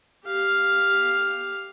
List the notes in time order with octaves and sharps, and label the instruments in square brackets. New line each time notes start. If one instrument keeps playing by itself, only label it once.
[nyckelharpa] G4 F5